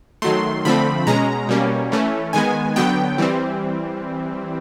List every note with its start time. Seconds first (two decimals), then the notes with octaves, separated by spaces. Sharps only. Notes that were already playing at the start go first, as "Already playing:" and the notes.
0.22 D#3 F#3 A3 C6
0.65 D3 F3 A3 C4 B5
1.07 B2 G#3 C#4 A#5
1.49 B2 G3 A#3 C#4
1.92 E3 A3 C#4
2.33 D#3 G#3 B3 G#5
2.76 D3 F#3 B3 G5
3.18 E3 G3 C4